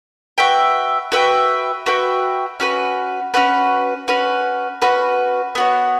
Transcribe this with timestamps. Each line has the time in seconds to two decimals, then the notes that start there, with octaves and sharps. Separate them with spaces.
0.38 F#4 B4 E5 G5
1.12 F#4 B4 E5 G5
1.86 F#4 B4 E5 G5
2.60 C#4 F#4 B4
3.34 C#4 F#4 B4
4.08 C#4 F#4 B4
4.82 C#4 F#4 B4
5.55 B3 F#4 C#5